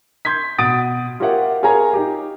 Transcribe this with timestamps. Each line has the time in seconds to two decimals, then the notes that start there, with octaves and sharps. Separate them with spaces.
0.25 C6 G6 G#6 B6
0.58 B2 F#5 D#6 A6 D7
1.20 F4 G4 A#4 C#5 E5 F#5
1.63 F4 G#4 A#4 C#5 G#5 A#5
1.93 D#4 G4